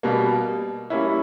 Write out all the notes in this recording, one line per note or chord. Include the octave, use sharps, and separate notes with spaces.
B2 G3 A#3
G3 A#3 C#4 E4